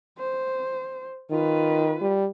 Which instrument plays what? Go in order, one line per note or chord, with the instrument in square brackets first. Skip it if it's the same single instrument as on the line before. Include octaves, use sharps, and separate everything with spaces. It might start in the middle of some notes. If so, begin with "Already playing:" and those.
[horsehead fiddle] C5
[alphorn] D#3 [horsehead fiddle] F4 B4
[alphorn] G3